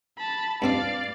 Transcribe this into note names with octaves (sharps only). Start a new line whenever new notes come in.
A5 B5
G2 C4 D4 D5 F5